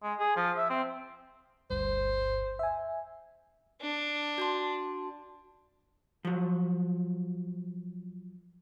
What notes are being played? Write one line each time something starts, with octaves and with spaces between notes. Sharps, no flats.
G#3
G#4
F3
E5
C4
G1 D2 G2 C5
E5 G#5
D4
F#4 A5 C6
F3 F#3